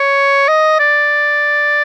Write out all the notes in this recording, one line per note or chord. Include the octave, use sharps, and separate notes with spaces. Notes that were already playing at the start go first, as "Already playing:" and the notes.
Already playing: C#5
D#5
D5